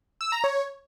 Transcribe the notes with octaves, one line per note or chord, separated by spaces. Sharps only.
E6
A#5
C#5